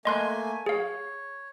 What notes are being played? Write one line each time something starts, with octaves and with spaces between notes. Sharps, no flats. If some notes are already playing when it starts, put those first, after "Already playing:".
A3 A#3 D#5 G#5 C6 F#6
G#4 C#5 F5